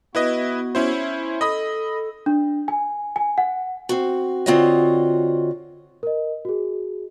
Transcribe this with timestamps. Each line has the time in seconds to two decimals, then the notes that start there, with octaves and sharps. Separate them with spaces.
0.15 B3 E4 F#4 B4 D#5
0.75 C#4 E4 C5
1.41 A4 D#5 B5 D#6
2.26 D4
2.68 G#5
3.16 G#5
3.38 F#5
3.89 C4 F#4
4.46 D3 C4 F4 F#4 C#5 D#5
6.03 A#4 D#5
6.45 F#4 G#4